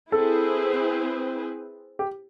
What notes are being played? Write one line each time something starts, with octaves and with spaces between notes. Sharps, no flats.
C4 E4 G#4 A4 B4
G4